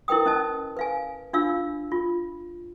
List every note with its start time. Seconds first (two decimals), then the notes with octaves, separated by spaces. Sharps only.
0.08 E4 A#4 B4 G5 D#6
0.26 C#4 D#5 A5
0.77 B4 F5 G#5
1.33 D4 F4 F5 E6
1.92 F4